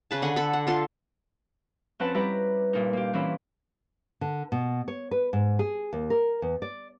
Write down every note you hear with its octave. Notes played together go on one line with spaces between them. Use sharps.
C#3 B4 A5
D3 F#5 G#5
A4 B5
F#5
F4 A4 C6
F2 C4 C#4 B4 F#5 A5
G3 E4 G4 B4 A#5
G2 A#2 D#4
A#3 G4
E3 C4 C#4 E4 F4
D3
B2
C#5
B4
G#2
G#4
D#2
A#4
E2
D5